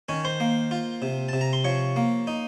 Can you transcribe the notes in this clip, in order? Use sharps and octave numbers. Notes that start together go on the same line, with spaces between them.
D#3 C#4 C#5
C5 C6
A#3
F4
C3
C3 A5
A#5
C6
F3 C#5 C#6
A#3
D#4